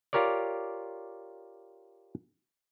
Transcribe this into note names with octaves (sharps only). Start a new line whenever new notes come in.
F4 G4 A#4 C#5 D5